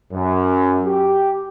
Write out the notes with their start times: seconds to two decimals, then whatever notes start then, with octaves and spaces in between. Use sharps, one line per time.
0.13 F#2
0.86 G4